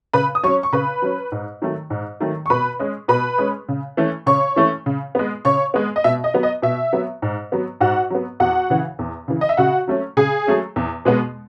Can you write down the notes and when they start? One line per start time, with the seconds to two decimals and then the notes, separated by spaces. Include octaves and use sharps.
0.13 C#3 B4 B5
0.35 D#6
0.43 F#3 C#4 C#5 C#6
0.63 C#6
0.73 C#3 B4 B5
1.02 F#3 C#4
1.32 G#2
1.62 D#3 F#3 A3
1.90 G#2
2.20 D#3 F#3 A3
2.46 C#6
2.50 B2 B4 B5
2.79 G#3 C#4
3.08 B2 B4 B5
3.38 G#3 C#4
3.69 C#3
3.97 E3 A3 C#4
4.26 C#3 C#5 C#6
4.56 E3 A3 C#4
4.86 C#3
5.15 G#3 B3
5.45 C#3 C#5 C#6
5.74 G#3 B3
5.96 D#5
6.04 B2 E5
6.24 D#5
6.34 F#3 B3
6.43 D#5
6.62 B2 E5
6.93 F#3 B3
7.22 G#2
7.52 F#3 B3
7.80 G#2 F#4 F#5
8.10 F#3 B3
8.40 E2 F#4 F#5
8.70 C#3 E3
8.99 E2
9.28 C#3 E3
9.41 D#5
9.49 E5
9.57 C#3 F#4 F#5
9.88 F#3 A3 C#4
10.17 C#3 G#4 G#5
10.47 F#3 A3 C#4
10.76 E2
11.05 B2 G#3 B3